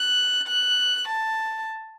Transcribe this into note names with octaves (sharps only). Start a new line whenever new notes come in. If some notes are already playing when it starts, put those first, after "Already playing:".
Already playing: F#6
F#6
A5